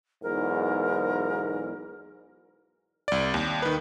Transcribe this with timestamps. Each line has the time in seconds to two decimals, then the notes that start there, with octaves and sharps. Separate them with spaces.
0.22 B1 E2 G#2 A#4
3.08 C2 D5
3.34 D#2
3.62 D#3 B4